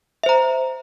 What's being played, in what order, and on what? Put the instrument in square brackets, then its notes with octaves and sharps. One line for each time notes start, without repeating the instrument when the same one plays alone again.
[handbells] E5
C5
A#5